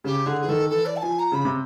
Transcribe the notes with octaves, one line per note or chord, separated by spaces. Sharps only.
C#3 G4
D3 G#4
E3 G#4
D#3 A4
E3 A4
D5
A5
F3 G#5
A#5
C#3 B5
C3